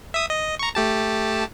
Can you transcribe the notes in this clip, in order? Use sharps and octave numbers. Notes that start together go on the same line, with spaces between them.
E5 D#6
D#5
A#5 C#6
A3 G4 A5